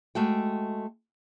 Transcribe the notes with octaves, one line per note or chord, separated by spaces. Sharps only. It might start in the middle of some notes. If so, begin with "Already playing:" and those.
G#3 A3 F#4 G5